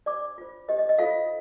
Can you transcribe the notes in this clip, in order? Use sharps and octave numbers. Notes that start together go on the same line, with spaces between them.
D4 G4 C5 D5 D6
F4 C5
D4 G4 C5 D#5
D#5
D#5
D#4 F4 A4 C5 F5